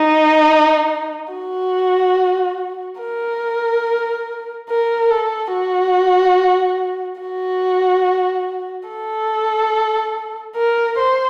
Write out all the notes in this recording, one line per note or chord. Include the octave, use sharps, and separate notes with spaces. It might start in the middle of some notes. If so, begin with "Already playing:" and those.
Already playing: D#4
F#4
A#4
A#4
A4
F#4
F#4
A4
A#4
C5